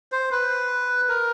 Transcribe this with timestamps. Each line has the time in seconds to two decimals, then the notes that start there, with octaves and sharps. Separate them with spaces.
0.12 C5
0.31 B4
1.09 A#4